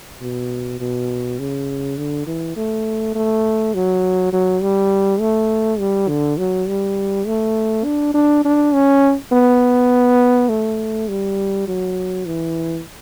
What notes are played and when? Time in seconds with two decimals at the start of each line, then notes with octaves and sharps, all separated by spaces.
0.22 B2
0.80 B2
1.39 C#3
1.97 D3
2.27 E3
2.56 A3
3.15 A3
3.74 F#3
4.33 F#3
4.62 G3
5.20 A3
5.79 G3
6.08 D3
6.38 F#3
6.68 G3
7.27 A3
7.85 D4
8.14 D4
8.45 D4
8.74 C#4
9.32 B3
10.49 A3
11.08 G3
11.68 F#3
12.26 E3